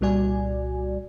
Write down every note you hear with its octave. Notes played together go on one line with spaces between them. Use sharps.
C2 A#2 G3 F#4 D5 G#5